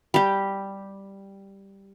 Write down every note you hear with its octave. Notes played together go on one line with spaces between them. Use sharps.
G3 G4